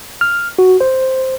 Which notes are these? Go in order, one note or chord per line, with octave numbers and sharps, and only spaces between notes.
F6
F#4
C5